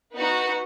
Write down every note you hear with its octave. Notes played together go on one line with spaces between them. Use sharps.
B3 D#4 F#4 B4 F#5